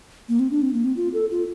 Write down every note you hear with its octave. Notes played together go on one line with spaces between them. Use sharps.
A#3
C4
D4
C4
A#3
C4
F4
A4
F4